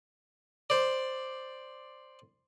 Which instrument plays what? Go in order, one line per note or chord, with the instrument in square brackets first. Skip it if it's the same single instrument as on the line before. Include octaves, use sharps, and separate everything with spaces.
[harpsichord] C5 D5